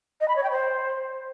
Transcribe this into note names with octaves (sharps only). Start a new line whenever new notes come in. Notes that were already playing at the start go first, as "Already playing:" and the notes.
D#5
B5
C#5
G5
C5